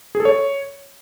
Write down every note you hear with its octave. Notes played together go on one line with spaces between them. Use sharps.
G#4
A4
C#5